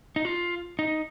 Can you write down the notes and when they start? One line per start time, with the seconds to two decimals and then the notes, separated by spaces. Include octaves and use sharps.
0.16 D#4
0.25 F4
0.79 D#4